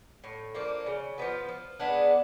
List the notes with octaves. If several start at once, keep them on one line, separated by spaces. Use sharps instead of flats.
A2
F3 A#3 D4
C#3
F3 G#3 B3
F3
G#3 B3 D4